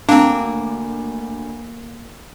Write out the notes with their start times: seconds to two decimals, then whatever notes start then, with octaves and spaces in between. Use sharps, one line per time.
0.09 D2 A#3 C4 D4 D6